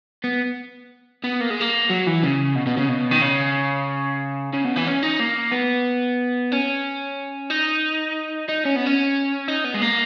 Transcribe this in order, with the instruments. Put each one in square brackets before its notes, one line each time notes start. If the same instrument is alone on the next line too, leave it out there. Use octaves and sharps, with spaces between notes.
[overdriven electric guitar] B3
B3
A#3
G#3
A#3
F#3
E3
C#3
B2
B2
C#3
B2
D#3
C#3
C#3
B2
E3
C#4
D#4
A#3
B3
C#4
D#4
D#4
C#4
B3
C#4
D#4
B3
G#3
A#3